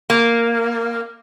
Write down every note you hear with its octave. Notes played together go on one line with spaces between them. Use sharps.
A#3